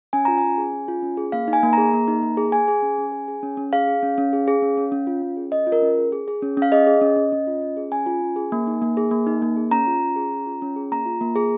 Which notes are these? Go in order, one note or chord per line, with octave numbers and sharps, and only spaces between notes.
C#4 G#5
F4 A#5
C#4 G#5
G#4
C#4
F4
C#4
G#4
A#3 F5
D#4
G#5
A#3
G#4 A#5
A#3
D#4
A#3
G#4
G#4 G#5
G#4
C#4
C#4
G#4
G#4
C#4
C#4
G#4 F5
G#4
C#4
C#4
G#4
G#4
C#4
C#4
C#4
F4
C#4
G#4
C#4 D#5
F4
A#4
C#4
G#4
G#4
G#4
C#4
C#4 F5
G#4 D#5
G#4
C#4
C#4
C#4
F4
C#4
G#4
C#4 G#5
F4
C#4
G#4
A#3
D#4
A#3
G#4
A#3
D#4
A#3
G#4
C#4 A#5
F4
C#4
G#4
C#4
F4
C#4
G#4
A#3 A#5
F4
A#3
G#4